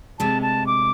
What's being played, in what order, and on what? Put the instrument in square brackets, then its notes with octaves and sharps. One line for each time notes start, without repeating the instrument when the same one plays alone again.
[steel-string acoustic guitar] D2 C3 G#3 [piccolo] A5
[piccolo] A5
D6